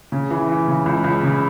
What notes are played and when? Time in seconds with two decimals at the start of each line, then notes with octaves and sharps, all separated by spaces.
0.12 C#3
0.31 E3
0.49 E3
0.68 C#3
0.86 C#2
1.04 C#2
1.23 C#3